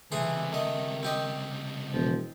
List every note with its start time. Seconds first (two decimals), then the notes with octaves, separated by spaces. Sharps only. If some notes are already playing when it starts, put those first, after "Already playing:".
0.12 C#2 C3 E3 A3 G#4 C6
0.53 D#3 A3 D#5
1.03 C4 G4 D#5
1.93 E1 F3